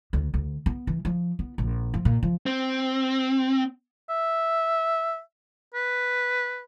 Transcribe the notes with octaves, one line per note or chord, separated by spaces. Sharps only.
D2
D2
B3
E3
F3
B3
A#1
F3
A#2
F3
C4
E5
B4